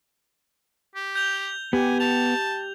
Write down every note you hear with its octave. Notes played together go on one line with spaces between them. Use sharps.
G4
G6 F7 G7
B3 G4 G#5
A5 F7